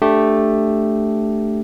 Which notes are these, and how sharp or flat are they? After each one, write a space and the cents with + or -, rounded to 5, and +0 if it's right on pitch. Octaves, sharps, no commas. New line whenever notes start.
A3 +0 D4 -5 G4 +0